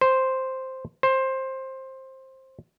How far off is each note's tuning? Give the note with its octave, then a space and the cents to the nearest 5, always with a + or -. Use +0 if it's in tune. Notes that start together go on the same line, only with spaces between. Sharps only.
C5 +0
C5 +15